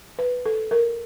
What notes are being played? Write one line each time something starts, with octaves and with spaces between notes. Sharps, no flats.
B4
A4
A#4